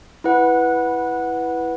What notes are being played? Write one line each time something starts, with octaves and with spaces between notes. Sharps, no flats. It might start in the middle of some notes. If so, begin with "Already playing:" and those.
E4 B4 F#5